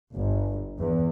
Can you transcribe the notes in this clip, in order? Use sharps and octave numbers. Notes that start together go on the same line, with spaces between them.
G1
E2